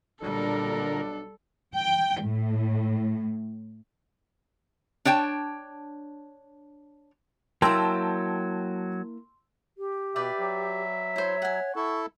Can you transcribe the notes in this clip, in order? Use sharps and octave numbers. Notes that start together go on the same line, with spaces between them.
B1 A#2 D3 G3 D4 A4 A#4
G5
A2
D4 C#5 G5 A5
F#3 A#3 E4 G5 A5 C6 E6
G4
B2 B4 D5 E5 G5
F#3
E4 C5 C#5
F#5 G#5
E4 A4 C#6